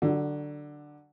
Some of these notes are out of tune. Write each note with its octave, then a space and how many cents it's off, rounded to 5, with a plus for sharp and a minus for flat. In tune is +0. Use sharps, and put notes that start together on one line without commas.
D3 +10 F#3 +30